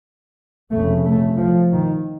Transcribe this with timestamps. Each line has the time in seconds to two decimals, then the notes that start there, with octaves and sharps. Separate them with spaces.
0.72 F1 F2 C#3 A3
1.05 A3
1.38 F3
1.72 D#3